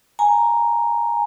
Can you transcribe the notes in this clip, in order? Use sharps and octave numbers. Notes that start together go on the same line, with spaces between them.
G#5 A#5